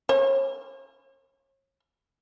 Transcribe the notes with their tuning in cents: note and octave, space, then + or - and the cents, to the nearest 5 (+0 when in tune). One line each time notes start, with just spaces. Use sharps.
C#5 -35